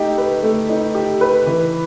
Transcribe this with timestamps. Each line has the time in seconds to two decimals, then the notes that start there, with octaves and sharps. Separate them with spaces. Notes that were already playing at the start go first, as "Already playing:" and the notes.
Already playing: A3 D#4 G4
0.18 B4
0.43 A3
0.69 D#4
0.95 G4
1.21 B4
1.47 E3